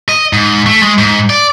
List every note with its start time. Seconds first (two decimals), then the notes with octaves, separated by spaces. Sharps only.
0.09 D#5
0.33 G#2
0.66 A3
0.82 G#3
0.98 G#2
1.30 D5